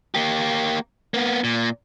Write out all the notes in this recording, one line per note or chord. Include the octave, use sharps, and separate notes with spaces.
A#3 G4
A#3 B3
A#2